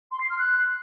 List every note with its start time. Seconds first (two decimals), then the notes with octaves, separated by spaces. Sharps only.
0.11 C6
0.20 C7
0.29 F6
0.38 F#6